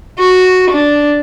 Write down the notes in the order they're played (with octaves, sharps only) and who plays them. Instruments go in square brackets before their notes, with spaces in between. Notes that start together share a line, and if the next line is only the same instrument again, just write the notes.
[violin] F#4
D4